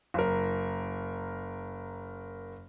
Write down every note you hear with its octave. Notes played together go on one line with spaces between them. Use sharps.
F#1 A#4